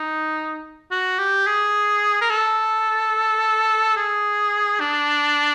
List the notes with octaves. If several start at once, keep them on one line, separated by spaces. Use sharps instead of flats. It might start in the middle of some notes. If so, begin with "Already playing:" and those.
Already playing: D#4
F#4
G4
G#4
A#4
A4
G#4
D4